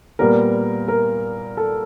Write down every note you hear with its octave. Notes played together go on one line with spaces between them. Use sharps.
A#2 G3 B3 A#4
A#4
A4